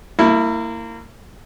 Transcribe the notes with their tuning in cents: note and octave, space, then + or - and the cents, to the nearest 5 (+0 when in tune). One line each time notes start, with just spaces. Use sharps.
A#3 -30 E4 +0